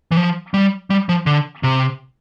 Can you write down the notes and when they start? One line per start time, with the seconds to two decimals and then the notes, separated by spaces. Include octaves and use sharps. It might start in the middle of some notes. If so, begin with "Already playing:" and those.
0.12 E3
0.17 F3
0.54 G3
0.90 G3
1.09 F3
1.26 D3
1.63 C3